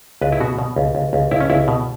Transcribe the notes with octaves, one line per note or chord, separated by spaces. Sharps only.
C#2 B4
E4
B2 F#4
B2
C#2
C#2
C#2
C#2 E4
C#4
C#2 E4
B2